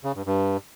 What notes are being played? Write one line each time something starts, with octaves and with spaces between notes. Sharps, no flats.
C#3
G2
G2